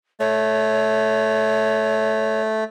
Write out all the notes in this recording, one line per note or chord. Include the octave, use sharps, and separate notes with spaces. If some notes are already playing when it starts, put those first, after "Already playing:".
A3 C#5